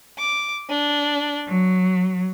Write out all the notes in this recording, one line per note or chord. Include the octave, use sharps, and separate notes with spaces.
D6
D4
F#3